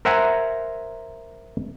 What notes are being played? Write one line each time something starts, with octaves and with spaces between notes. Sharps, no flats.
A#4 C5 E5 F#5 G#5 A#5